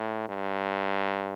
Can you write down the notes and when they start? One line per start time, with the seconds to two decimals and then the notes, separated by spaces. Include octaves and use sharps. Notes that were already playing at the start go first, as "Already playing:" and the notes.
Already playing: A2
0.29 G2